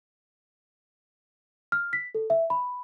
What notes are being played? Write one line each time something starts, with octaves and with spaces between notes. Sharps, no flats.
F6
B6
A4
E5
B5